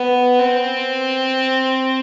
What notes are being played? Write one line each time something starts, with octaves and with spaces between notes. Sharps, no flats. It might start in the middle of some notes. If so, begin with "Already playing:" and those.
Already playing: B3
C4